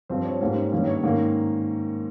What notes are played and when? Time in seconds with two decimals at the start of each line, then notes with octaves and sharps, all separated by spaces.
0.09 G2 F3 C4 C5
0.21 C5
0.25 C#5
0.41 G#2 G3 A#3 C#4 C5
0.71 G2 D#3 A#3 C#4
0.87 C#5
1.03 G#2 D#3 A#3 C#4